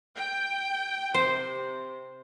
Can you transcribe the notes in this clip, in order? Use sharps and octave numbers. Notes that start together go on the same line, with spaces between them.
G5
C3 C5